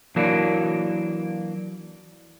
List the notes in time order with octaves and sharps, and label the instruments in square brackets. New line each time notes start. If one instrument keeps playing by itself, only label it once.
[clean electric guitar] E3 F#3 A#3 D4